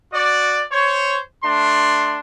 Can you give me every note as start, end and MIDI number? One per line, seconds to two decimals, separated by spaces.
0.13 0.62 66
0.13 0.62 74
0.72 1.18 72
0.72 1.18 73
1.44 2.20 57
1.44 2.20 62
1.44 2.20 84